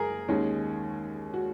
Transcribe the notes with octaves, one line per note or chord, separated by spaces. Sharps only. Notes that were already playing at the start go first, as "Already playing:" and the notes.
Already playing: F#1 G#4 A#4
D#2 D#3 G#3 C#4
F#4